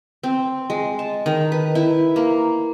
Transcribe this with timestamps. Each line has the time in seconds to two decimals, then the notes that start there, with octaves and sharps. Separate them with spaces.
0.23 C4
0.70 G#3
0.99 A5
1.26 D#3
1.52 B4
1.75 E4
2.16 A#3